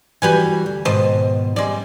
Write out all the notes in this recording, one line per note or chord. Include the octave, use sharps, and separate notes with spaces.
E3 G3 F#4 G4 B4 G#5
D2
G#2 B2 D#3 C5 D#5 A5
G3 G#3 C#4 D5